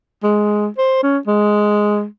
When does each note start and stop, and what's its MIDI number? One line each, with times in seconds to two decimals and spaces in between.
0.23 0.67 56
0.78 1.01 72
1.03 1.18 61
1.27 2.05 56